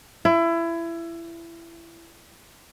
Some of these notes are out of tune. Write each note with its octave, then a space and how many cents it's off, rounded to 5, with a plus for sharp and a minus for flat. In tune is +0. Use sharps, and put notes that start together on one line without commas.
E4 +25